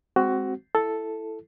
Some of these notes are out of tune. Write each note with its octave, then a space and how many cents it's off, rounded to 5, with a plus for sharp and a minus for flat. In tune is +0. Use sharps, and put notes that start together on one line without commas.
G#3 +0 C4 +0 F#4 +15
E4 +5 A4 +0